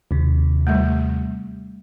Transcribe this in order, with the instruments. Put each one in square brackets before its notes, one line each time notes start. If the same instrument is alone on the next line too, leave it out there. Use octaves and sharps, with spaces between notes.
[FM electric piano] D#2 C3
[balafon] G3 A3